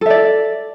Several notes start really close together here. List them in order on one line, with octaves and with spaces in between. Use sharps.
A4 E5 D5